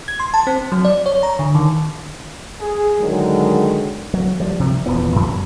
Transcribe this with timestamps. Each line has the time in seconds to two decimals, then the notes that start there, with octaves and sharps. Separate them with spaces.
0.08 G#6
0.20 C6
0.34 A5
0.47 C4
0.72 F#3
0.85 D5
1.06 C#5
1.23 A#5
1.39 D3
1.55 D#3
2.61 G#4
2.99 D3 D#3 F#3 G#3
4.14 F#3
4.40 F3 G3
4.60 C3
4.86 D#1 E2 F3 B3
5.16 F#2